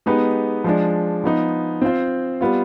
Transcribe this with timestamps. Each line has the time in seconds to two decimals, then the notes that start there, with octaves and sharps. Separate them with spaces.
0.06 G#3 B3 D#4 G4 B4
0.64 F3 G#3 D4
1.24 F3 B3 D#4
1.82 C4 F4 C5
2.41 G3 B3 F4